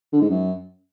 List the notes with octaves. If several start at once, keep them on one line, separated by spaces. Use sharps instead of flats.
D3
G#2
F#2